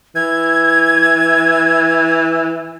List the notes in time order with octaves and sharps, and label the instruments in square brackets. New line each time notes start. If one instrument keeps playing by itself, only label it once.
[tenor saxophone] E3 [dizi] G#6